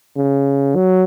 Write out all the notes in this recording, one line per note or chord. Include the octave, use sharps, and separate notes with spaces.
C#3
F#3